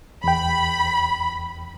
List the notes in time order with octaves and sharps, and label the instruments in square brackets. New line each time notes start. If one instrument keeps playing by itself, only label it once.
[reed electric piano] E2 G5 [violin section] B5